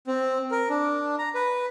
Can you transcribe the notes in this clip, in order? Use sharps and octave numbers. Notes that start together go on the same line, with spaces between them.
C4
A#4
D4
A#5
B4